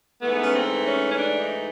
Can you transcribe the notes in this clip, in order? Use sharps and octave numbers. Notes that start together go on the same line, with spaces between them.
G#2 E3 A3 B3
C#4
C4
C#4
C#4
D4
D#4